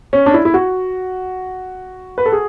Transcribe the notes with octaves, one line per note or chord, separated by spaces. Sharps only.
C#4
D4
E4
E4
F#4
B4
A4
G#4